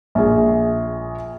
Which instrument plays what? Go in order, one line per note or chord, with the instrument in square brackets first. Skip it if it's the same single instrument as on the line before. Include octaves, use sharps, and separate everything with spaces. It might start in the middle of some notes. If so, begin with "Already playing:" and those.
[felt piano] A#1 G#4